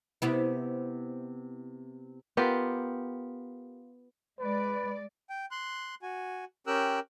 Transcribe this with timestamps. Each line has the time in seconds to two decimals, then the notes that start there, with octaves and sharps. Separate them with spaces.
0.22 C3 B3 E4
2.37 B3 F4 G4 A#4
4.39 G#3 B4 D5
5.30 G5
5.51 C6 F#6
6.02 F#4 G#5
6.67 C#4 G4 A#4 G5 E6 F#6